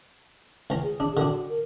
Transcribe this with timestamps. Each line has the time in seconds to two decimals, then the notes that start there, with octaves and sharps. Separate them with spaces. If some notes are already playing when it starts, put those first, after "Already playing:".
0.70 C#2 A#5
0.83 G#4
1.00 D4
1.17 D3 D4 F#4
1.49 A#4